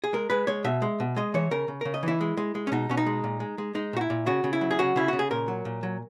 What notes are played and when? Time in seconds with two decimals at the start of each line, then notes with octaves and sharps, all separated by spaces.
0.04 G#4
0.13 G#3 A#4
0.30 G#3 B4
0.47 G#3 C#5
0.64 B2 E5
0.82 G#3
1.00 B2
1.16 G#3 D#5
1.34 E3 C#5
1.51 C#3 A#4
1.68 C#3
1.81 C#3 A#4
1.94 D#5
2.03 E3 E4
2.21 G#3
2.37 G#3
2.55 G#3
2.67 C#4
2.72 B2 D#4
2.89 B2 C#4
2.97 D#4
3.06 G#3
3.24 A#2
3.40 G#3
3.58 G#3
3.75 G#3 D#4
3.93 A#2 F#4
4.01 E4
4.10 A#2
4.26 C#3 F#4
4.44 C#3
4.53 E4
4.61 F#3
4.71 G#4
4.79 C#3 F#4
4.96 C#3 E4
5.08 C#3 F#4
5.19 G#4
5.31 A#2 A#4
5.48 F#3
5.65 A#2
5.83 F#3